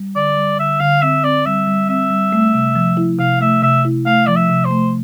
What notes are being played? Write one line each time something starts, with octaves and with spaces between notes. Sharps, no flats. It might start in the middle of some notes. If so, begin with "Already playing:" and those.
Already playing: G3
D3 D5
G3
D3 E5
D3 F5
C4 E5
C4 D5
G3 E5
G3
C4 E5
G3
A3
C3
F3
E4
C3 F5
A3 E5
C3 E5
E4
A3 F5
F3 D5
E5
C3
C5
A3